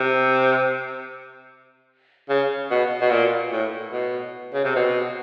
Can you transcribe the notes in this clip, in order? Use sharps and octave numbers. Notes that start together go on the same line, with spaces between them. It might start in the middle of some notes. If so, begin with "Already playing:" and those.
Already playing: C3
C#3
B2
B2
A#2
A2
B2
C#3
C3
B2